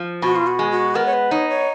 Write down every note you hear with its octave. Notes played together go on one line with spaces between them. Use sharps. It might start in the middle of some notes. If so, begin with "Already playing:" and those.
Already playing: F3
B2 F#4
F4
F#4
G#3
F#4
B3 A#4
C#5
B4
D#4 C#5
C#5